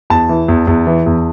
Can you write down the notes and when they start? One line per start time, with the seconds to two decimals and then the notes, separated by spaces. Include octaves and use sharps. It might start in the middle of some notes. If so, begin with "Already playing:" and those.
0.10 E2 A5
0.29 E3
0.48 E2
0.67 E2
0.87 E3
1.06 E2